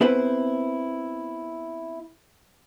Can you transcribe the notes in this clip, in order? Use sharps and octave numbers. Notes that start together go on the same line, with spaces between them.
B3 C4 E4 G#4 B4 C5